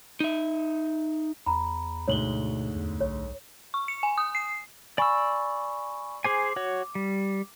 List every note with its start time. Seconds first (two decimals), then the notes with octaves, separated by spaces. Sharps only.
0.20 D#4 E5
1.46 E2 A#5 B5
2.08 D2 G#2 B2 C#5 F#7 G7
2.76 E2
3.01 B1 C#5
3.74 C#6
3.88 C#7
4.03 G#5
4.18 D#6
4.35 C7
4.98 D5 G#5 B5 C#6 E6
6.24 G#4 C5 G#5 D6
6.56 F#4 C#5
6.95 G3